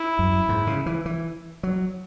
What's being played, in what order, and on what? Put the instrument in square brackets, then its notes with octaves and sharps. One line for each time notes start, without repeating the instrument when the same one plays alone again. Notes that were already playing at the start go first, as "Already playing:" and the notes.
Already playing: [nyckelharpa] E4
[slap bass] F#2
G#2
C#3
E3
E3
F#3